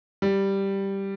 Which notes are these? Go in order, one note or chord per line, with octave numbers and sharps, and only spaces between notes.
G3